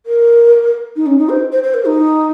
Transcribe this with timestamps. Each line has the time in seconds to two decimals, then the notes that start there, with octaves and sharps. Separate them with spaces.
0.06 A#4
0.96 D#4
1.06 C#4
1.19 D#4
1.29 C5
1.52 C5
1.63 C5
1.74 A#4
1.85 D#4